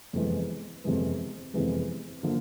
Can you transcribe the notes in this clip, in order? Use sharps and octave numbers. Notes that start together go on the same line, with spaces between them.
F2 C3 E3 G#3 B3
F2 C3 E3 G#3 B3
F2 C3 E3 G#3 B3
D3 F3 A#3